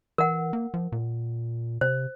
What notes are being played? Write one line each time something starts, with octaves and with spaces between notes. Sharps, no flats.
E3 A#4 F#5
A#3
F3
A#2
C3 C5